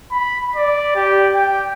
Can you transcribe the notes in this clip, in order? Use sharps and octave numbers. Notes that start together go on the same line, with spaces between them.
B5
D5
G4
G5